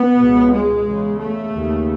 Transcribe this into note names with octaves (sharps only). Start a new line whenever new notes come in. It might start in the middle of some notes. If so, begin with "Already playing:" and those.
Already playing: B3
C#2 B2
G#3
E2 C#3
A3
D#2 C#3